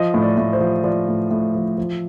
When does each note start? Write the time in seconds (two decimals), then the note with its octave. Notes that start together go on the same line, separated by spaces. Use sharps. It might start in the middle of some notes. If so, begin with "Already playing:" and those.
Already playing: F3 D#5
0.14 A2
0.22 D5
0.38 A2
0.53 C5
0.61 F3
0.84 F3 D5
1.08 A2
1.31 A2
1.55 F3
1.78 F3